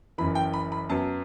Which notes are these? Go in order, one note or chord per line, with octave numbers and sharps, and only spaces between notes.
F#1 F#2 E3 B5
G5
B5
B5
F#2 F#3 B3 A5